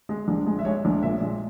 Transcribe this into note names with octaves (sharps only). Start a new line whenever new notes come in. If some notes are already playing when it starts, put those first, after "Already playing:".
G#3
A#1
G#3
E5
G#3 C#5
A#1
A#2 E5
G#3